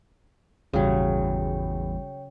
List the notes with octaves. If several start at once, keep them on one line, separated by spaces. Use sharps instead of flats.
G#1 E2 A#2 C#3 F#3 G3 C#5 G5